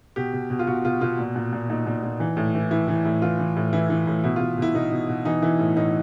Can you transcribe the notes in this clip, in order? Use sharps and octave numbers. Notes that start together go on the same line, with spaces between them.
B2 G4
B2
B2
F4
B2 F#4
B2 F4
B2 F4
A#2
A#2
A#2
A#2 D#4
A#2
A#2
E3
A2
E3
E3 E4
E3
A2
E3 F4
E3
A2
E3 E4
E3
A2
B2 E4
F4
B2
B2 E4
B2 D#4
B2
B2
E3 D#4
E3 E4
A2
A2 D#4